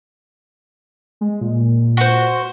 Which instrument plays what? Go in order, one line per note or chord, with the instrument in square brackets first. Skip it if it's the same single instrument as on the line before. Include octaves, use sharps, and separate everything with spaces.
[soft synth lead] G#3
A#2
[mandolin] F#4 C5